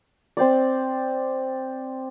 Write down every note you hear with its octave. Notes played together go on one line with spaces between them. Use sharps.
C4 C5 D5